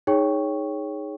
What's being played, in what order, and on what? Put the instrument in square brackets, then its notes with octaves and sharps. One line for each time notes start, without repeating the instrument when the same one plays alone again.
[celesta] D#4 G#4 C#5 G5 C#6